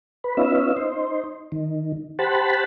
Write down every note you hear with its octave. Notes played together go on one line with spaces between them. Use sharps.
B4
B3 C#4 D#4 F4 E5
D#4 C5
D#3
G4 C5 F#5 A5 B5